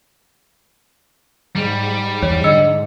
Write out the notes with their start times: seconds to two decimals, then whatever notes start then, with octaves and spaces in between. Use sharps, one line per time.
1.56 G#2 G3
2.22 E2 C#5
2.44 D3 D#5 E6 C#7